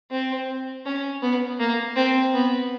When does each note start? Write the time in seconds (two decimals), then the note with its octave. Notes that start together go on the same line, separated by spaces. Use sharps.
0.11 C4
0.86 C#4
1.22 B3
1.60 A#3
1.96 C4
2.34 B3